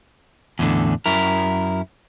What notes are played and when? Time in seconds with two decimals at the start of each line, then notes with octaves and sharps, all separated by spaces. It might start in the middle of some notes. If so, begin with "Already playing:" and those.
0.59 E2 A2 D3
1.06 F#2 E4 A#4